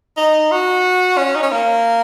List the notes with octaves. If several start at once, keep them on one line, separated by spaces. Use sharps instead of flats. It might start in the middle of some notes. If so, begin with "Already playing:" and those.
D#4
F#4
C#4
D#4
C#4
A#3